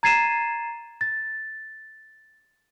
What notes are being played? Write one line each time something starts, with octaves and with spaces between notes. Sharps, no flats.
A#5 G#6 A6 C7 D#7 E7
A6